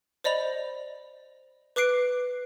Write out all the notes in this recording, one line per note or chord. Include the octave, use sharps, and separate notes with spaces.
C5 D5 D#5 B5 F7
B4 D6 F#6 C7 D7